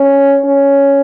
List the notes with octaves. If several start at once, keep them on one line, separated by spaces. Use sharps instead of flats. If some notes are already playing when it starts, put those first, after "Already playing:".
Already playing: C#4
C#4